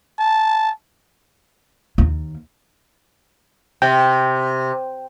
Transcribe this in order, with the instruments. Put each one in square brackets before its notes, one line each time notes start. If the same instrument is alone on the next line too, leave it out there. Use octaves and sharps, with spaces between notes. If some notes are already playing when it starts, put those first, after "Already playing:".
[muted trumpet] A5
[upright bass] D#2
[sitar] C3 [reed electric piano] G5